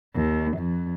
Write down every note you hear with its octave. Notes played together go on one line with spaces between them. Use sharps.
D#2
F2